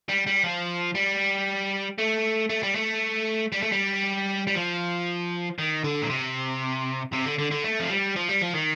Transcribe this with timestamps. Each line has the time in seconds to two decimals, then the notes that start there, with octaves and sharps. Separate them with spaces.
0.09 G3
0.27 G3
0.44 F3
0.95 G3
1.98 A3
2.50 A3
2.63 G3
2.75 A3
3.53 G3
3.62 A3
3.72 G3
4.47 G3
4.55 F3
5.58 D#3
5.84 D3
6.02 A#2
6.10 C3
7.13 C3
7.26 D3
7.39 D3
7.51 D3
7.64 A3
7.80 F3
7.90 G3
8.16 F3
8.29 G3
8.41 F3
8.54 D#3